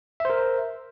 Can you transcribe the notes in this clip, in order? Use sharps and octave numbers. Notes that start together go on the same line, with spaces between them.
A#4 C5 E5